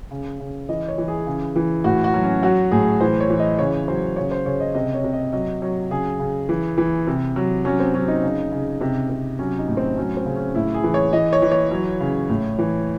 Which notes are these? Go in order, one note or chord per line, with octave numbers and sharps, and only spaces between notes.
C#3
C#3
E3 D#5
C#5
E3
G#4
C#3
E3
A2 F#4
F#4
F#3
C#4
F#3 F#4
A2 G#4
E3 C5
C#5
E3
D#5
C#3 C#5
F#3 C5
C#3 C#5
C5
C#3 C#5
D#5
C3 D#5
C#5
C3
D#5
F#3 D#5
F#3 C#5
C#3 G#4
C#3
E3
E3
C3
F#3
F#3 C#4
C4
F#3 C#4
D#4
C#3
C#3
C3
C3
F#3 C#4
D#4
A2
C4
F#3 C#4
C4
C#3
C#4
A2 E4
G#4
E3
C#5
E3 D#5
C#5
E3
C#5
F#3
C#3
A2
E3